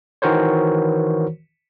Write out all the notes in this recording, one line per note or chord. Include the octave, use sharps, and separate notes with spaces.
D#3 E3 F#4 A#4 C5 C#5